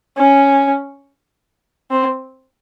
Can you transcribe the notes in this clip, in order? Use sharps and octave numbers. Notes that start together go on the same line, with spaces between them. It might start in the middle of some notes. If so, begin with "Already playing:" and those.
C#4
C4